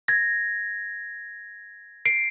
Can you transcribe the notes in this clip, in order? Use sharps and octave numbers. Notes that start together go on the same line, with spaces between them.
G#6 A#6
C7 D7